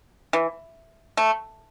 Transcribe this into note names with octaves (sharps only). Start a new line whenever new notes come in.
E3
A3